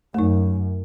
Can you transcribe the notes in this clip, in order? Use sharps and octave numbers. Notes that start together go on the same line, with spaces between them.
F#2 A3 D#4